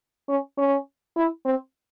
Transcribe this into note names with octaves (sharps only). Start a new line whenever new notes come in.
C#4
C#4
E4
C4